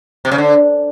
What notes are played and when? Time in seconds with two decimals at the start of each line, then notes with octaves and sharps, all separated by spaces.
0.25 C3
0.32 C#3
0.38 D3